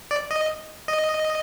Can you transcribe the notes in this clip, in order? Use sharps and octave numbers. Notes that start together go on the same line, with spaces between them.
D5
D#5
D#5